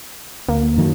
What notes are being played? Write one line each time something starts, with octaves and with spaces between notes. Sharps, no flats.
D2 A#3
F#2 D#3 F#3